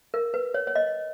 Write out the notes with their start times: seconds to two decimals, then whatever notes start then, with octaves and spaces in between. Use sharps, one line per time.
0.14 A#4
0.34 B4
0.54 C#5
0.67 C#5
0.75 D#5